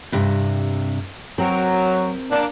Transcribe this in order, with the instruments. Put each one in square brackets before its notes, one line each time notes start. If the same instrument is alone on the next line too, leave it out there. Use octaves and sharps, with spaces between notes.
[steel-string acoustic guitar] G2 C3
[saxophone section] F#3 [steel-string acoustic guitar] C4 A#4
[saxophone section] A#3 D4